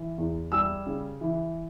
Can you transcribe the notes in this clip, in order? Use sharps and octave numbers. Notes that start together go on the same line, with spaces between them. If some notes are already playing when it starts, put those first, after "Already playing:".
Already playing: E3
E2
G3 E6
C#3
E3